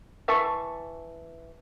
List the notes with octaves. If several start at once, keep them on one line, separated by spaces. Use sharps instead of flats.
E3 E5 A5 C#6